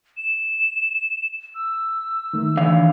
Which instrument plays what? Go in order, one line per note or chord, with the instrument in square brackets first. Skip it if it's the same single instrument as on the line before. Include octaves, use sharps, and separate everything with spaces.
[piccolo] E7
E6
[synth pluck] D#3 A3
[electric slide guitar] D3 E3 F5